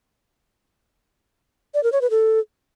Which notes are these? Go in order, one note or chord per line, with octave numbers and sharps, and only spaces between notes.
D5
A#4
C#5
B4
A4